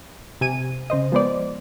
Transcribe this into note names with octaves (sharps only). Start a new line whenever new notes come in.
C3 G#5 D#7
C#3 C5 D#5
F3 G#3 B3 C5 D5